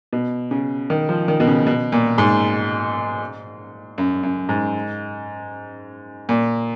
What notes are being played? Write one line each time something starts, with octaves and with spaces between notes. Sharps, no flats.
B2
C#3
D#3
F3
D#3
B2
C#3
B2
A#2
G#2
F#2
F#2
G#2
A#2